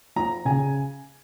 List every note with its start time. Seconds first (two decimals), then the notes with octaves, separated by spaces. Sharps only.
0.16 F3 A#5
0.45 C#3 G#5